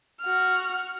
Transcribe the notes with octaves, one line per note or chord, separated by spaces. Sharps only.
F#4 F6